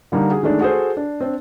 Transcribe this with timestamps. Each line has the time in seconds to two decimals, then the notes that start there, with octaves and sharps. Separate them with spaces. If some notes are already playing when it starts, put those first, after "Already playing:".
0.12 D3 G3 A#3 D#4
0.30 F#4 G#4
0.43 D#3 G#3 A3 D4
0.61 F#4 G#4 A4 C5
0.97 D4
1.20 C4 D4